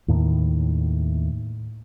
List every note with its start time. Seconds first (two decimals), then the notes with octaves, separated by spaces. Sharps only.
0.08 D#2 A2 D#3